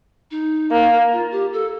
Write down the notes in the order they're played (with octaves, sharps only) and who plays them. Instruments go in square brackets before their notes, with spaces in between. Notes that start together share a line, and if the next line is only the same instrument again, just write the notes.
[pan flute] D#4
[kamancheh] A#3
[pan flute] F4
G4
A4